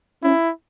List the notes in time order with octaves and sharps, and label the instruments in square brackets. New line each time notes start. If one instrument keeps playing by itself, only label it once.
[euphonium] C#4 [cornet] E4